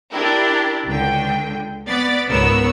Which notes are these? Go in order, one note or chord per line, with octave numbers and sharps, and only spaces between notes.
D4 E4 G4 A#4
C#2 D3 G5
B3 D5 A6 B6
C#2 G#2 B3 A#4 C#5 E6